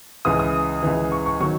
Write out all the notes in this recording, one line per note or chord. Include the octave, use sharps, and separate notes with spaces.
C#2 C#3 E3 D#6
D#6
C#2 C#3 E3
C#6
C#6
D#3 F#3 C#6